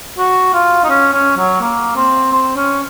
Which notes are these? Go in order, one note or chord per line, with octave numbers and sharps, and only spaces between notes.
F#4
F4
D#4
C#4
C#4
F#3
A#3
C4
C4
C#4